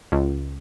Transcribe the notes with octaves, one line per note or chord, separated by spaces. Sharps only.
C#2